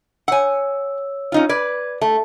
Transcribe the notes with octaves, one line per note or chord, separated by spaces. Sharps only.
C#5 F#5 G#5 E6
C#4 D#4 F4
B4 D5 G#6
A3 A5